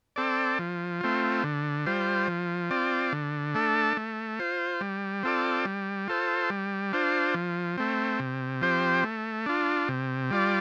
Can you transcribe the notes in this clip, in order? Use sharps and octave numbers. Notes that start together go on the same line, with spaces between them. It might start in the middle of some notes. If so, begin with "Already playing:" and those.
C4 A4 D5
F3
A3 C4 F4
D3
G3 F4 C5
F3
C4 F4 D5
D3
A3 D4 A4
A3
F4 C5
G3
C4 F4 A4 D5
G3
F4 A4 C5
G3
D4 F4 C5
F3
A3 C4
C3
F3 C4 G4 C5
A3
D4 F4
C3
G3 F4 D5